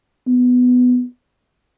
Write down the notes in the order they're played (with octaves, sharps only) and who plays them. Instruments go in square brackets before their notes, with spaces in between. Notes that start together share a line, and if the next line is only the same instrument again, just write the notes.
[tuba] B3